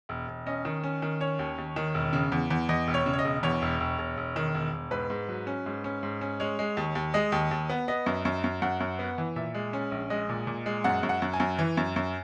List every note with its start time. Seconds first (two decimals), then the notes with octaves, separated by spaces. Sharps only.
0.09 E1
0.28 E1
0.46 C#4 D#5
0.65 D#3
0.83 C#4
1.02 D#3
1.21 C#4 C#5
1.39 D#2
1.58 D#2
1.76 D#3
1.94 E1
2.13 C#3
2.32 E2
2.50 E2
2.69 E2 D#5
2.87 E1
2.94 C#5
3.06 C#3
3.13 C#5
3.19 D#5
3.25 E1
3.43 E2 C#5
3.62 E1
3.80 E1
3.98 E1
4.17 E1
4.36 D#3
4.54 E1
4.73 E1
4.91 G#2 B4
5.10 G#2
5.29 F#3
5.47 C#4
5.66 G#2
5.84 C#4
6.03 G#2
6.21 C#4
6.40 G#3 C#5
6.59 G#3
6.77 D#2
6.95 D#2
7.14 G#3 D#5
7.32 D#2
7.51 D#2
7.69 B3
7.88 B3 D#5
8.06 F#2
8.25 F#2
8.44 F#2
8.62 F#2 F#5
8.80 F#2
8.99 B3
9.18 E3
9.36 A#2 E5
9.55 G#3
9.73 C#4
9.91 A#1
10.10 G#3 D#5
10.29 A#2
10.47 A#2
10.66 G#3
10.84 F#2 F#5
11.03 F#2
11.09 F#5
11.22 F#2
11.33 G#5
11.40 F#2
11.59 E3
11.77 F#2
11.96 F#2